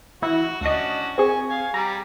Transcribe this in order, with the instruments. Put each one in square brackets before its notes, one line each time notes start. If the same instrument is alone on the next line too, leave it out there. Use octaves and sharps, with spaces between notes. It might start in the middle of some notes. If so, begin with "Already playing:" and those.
[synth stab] E3 E4 [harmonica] F#4
[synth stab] D2 D#5 [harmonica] C#4 D4 F#4
[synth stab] C4 G#4 [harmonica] G#5 C#6
[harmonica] F5 G#5
[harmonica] G3 [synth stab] A#5